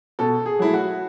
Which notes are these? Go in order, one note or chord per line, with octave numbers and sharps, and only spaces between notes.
B2 A4
G#4
F#3 A3 E4
F#4